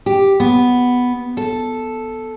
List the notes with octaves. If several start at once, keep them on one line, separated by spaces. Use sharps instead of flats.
G4
B3
A4